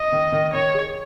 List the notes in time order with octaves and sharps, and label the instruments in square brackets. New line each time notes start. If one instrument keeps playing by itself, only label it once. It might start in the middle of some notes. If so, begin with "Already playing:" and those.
Already playing: [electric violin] D#5
[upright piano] D#3
D#3
[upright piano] D#3 [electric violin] C#5
[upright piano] G#4